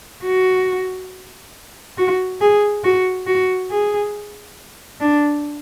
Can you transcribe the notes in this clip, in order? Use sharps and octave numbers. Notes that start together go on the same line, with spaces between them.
F#4
F#4
G#4
F#4
F#4
G#4
D4